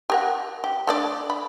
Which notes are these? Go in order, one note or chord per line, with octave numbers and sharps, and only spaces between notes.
G4 A#4 F#5
G4
A3 D4 D5
B5